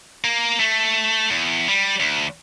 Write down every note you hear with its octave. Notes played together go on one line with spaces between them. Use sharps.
A#3
A3
E2
G3
D2